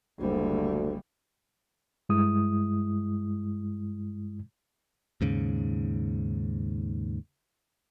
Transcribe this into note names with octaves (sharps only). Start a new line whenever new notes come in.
F#1 D2 G3
G2 G#3 E4 D#6
D#2 G#2 C#3